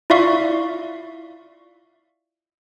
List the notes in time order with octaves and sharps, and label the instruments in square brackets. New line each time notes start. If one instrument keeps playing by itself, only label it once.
[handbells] E4 F4 D5 E5 F5 C#6